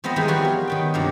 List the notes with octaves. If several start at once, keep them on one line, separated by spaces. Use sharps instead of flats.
F3 B3 C4 C5 D#5 A#5
D#3 E3 G3 G#3 B3 D#4
F3 G3 B3 F4 F#4 C#5
F#3
D#3 B3 G5
G2 C3 F3 F#3 A#3